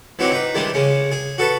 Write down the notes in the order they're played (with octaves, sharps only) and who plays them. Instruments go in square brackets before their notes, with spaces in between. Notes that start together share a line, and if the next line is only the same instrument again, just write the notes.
[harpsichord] E3 F#3 C4 D#4 F#4 G4
D#4 B4
D#3 E3 G3 G#3 D4
C#3 G#3 C#4
G#4
F#4 A4 B4 A5